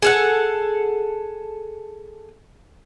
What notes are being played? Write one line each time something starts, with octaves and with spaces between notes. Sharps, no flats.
G#4 A4 F#5